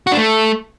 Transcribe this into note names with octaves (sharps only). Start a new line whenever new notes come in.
F#4
D4
A3